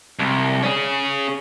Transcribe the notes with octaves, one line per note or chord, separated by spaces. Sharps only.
C2
C#4 G#4